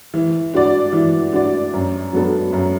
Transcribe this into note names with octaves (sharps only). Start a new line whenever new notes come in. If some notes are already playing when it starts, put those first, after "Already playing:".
E3
D4 F#4 D5
E3
D4 F#4 D5
F#2
F#3 B3 D4 A4
F#2